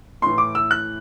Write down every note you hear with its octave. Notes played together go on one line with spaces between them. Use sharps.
A2 E3 C6
D6
E6
F#6